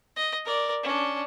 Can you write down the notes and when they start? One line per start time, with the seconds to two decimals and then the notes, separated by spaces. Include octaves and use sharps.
0.16 D#5
0.45 A#4 D5
0.83 C#4 D4